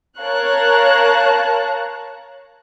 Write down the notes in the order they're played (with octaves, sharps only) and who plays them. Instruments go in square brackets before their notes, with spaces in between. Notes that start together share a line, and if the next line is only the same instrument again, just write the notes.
[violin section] A#4 C#5 F5 A5 A#5 F#6